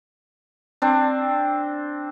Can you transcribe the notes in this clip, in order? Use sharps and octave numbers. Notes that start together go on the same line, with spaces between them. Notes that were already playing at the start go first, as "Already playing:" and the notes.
C4 D4